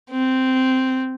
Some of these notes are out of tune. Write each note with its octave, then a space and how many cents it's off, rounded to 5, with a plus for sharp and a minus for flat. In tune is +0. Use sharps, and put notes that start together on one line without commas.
C4 -10